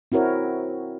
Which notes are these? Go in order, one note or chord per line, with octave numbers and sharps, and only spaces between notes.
C4 E4 F#4 A#4 C#5